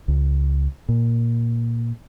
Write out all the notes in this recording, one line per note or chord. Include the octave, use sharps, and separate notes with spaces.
C#2
A#2